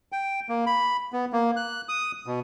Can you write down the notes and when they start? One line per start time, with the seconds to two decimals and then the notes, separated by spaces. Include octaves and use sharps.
0.12 G5
0.49 A#3
0.66 B5
1.13 B3
1.33 A#3
1.57 F#6
1.89 D#6
2.26 B2